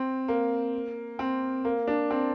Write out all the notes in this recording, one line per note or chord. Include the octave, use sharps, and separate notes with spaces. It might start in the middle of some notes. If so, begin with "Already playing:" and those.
Already playing: C4
A#3
C4
A#3
D4
C4